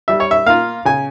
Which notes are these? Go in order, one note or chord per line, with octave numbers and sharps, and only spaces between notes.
G3 E5
C#5
E5
A#3 F4 F5
C#3 G#5